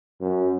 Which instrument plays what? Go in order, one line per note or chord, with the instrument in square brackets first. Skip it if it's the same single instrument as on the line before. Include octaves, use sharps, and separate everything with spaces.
[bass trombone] F#2